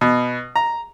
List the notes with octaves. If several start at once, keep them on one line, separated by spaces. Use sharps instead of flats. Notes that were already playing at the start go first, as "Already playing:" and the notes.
B2
A#5